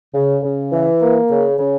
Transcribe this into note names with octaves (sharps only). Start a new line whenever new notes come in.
C#3
C#3
E3
A#3
C#3
C#3